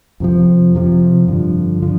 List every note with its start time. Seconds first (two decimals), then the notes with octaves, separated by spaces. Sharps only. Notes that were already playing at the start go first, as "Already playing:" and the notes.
0.20 F2 C3 F3
0.75 F2 C3 F3
1.28 G2 D3 F3
1.82 D3 F3